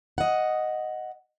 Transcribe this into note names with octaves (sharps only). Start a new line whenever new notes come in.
D#5 F#5